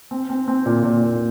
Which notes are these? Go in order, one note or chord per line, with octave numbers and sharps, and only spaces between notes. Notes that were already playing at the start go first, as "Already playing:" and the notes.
C4
C4
C4
A#2
A#2
A#2